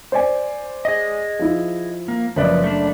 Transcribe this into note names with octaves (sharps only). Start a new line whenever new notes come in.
C5 D5 G#5
G#4 D#5
F3 E4
A#3
F#1 F3 B4 D5
A3 D4